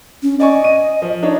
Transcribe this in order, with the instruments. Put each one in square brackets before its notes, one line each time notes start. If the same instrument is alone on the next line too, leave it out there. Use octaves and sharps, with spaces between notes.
[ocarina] C#4
[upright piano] D5 G#5 C#6 [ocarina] D#5
[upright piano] D#7
F3
D4 D#4 C#5